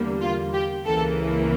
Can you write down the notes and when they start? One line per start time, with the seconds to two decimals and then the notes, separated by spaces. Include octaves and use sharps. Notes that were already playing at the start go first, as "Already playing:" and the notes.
Already playing: E2 D3 G3 A#3
0.22 F4
0.54 G4
0.85 C#2 C#3 E3 A#3 A4